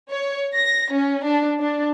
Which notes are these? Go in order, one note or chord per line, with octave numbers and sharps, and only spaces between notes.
C#5
A#6
C#4
D4
D4